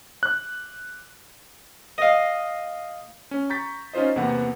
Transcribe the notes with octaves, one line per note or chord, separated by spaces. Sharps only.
F#6
D#5 F5
C#4
A#5 C#6 G6 A6 B6
C#4 D#4 F4 C5 D#5
E2 C3 A#3 B3 F#5